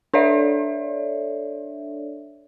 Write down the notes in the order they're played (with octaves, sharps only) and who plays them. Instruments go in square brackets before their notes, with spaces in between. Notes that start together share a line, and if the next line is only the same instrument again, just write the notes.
[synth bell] D4 A4 C#5 D5 E5